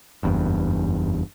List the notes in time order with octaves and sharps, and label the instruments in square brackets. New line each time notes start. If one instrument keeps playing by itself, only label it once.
[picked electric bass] F#1 E2 G2